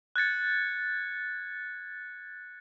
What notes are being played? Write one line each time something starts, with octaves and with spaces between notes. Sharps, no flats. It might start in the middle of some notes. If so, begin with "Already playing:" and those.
F#6 G#6 A6 C#7